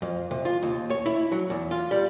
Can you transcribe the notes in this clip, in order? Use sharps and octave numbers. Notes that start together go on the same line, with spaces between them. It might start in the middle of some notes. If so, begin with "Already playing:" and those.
F2
C3
F4
D#2
C#5
E4
F#3
E2
F4
G3